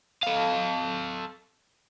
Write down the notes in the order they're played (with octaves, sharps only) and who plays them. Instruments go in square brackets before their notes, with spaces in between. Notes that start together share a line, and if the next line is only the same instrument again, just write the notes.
[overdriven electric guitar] A4 F5